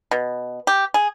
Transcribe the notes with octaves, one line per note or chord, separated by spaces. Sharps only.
B2
G4
G#4